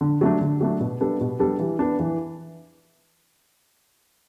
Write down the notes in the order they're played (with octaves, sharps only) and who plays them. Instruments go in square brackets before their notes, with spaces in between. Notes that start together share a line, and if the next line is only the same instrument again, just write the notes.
[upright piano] D3
F#3 A3 D4
D3
F#3 A3 D4
B2
G3 B3 D4 A4
B2
G3 B3 D4 A4
E3
B3 D4
E3